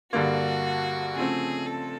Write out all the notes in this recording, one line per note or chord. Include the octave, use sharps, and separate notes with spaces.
G2 D3 G3 A#3 F#4
C#3 F3 A3 C4 G#4
A4